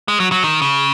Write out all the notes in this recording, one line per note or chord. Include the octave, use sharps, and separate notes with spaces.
G#3
F#3
F#3
D#3
C#3